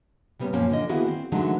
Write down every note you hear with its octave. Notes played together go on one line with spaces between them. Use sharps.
C3 G3 B3 C#4
F#2 A#2 F3 A#3 C#4
D3 F4 D#5
D#3 A#3 B3 E4 F#4 G#4
C4
D3 E3 F#3 G#3 A3 D#4